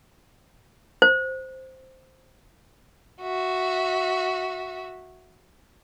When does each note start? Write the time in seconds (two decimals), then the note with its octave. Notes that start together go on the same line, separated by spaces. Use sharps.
1.02 C5
3.22 F#4 E5